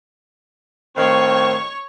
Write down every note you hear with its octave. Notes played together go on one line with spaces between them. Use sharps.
A2 D#3 C4 C#5 F5 C#6